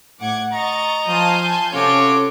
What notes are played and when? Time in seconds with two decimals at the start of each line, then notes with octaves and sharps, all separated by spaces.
0.20 A2 F#5 D6 G#6
0.53 D#5 A#5 C#6 A6
1.08 F3 F5 G#5 A5 C6 D#6 G6
1.73 C3 C#4 F4 F#4 A4 C#5 D6